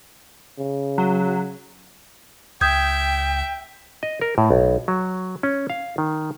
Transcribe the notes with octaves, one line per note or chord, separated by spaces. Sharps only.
C#3
F#3
C#2 E5 G5 D#6 G6 G#6
D#5
A#4
A2
B1
F#3
C#4
F5
D#3